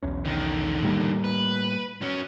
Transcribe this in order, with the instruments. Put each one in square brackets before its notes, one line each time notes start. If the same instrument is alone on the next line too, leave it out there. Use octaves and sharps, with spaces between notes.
[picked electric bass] B1 E2 C#4
[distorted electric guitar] D3 D#3
[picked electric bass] A2 G3 A#3
[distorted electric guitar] B4
F#3 C#4